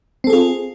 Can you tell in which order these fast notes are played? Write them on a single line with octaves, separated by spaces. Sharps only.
C4 A4 G#4 F4